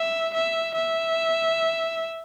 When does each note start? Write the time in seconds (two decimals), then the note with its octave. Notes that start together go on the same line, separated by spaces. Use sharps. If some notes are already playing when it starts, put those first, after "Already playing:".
Already playing: E5
0.35 E5
0.75 E5